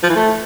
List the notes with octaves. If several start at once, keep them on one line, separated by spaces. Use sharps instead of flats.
F3
E3
A3